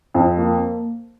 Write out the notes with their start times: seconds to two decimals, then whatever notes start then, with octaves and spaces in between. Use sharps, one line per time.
0.14 F2
0.37 A#3